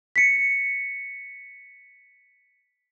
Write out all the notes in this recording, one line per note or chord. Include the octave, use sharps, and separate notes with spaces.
B6 C#7